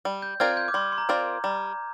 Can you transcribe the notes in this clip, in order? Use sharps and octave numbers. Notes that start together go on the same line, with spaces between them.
G3
G6
C4 F4 A#4 D5 F6 G#6
G6
D6
G3 C6
C6
A#5
C4 F4 A#4 D5
G3 A#5